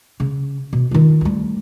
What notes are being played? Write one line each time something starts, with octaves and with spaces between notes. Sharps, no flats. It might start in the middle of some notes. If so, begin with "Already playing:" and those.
C#3
B2
D#3 F4
D2 G3